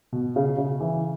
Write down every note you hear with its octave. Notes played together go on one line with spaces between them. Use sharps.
B2
C#3
C#3
E3